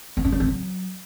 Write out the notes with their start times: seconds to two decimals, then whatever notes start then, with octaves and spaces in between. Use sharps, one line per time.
0.17 B3
0.25 C#4
0.32 F#3
0.40 C4
0.48 F#3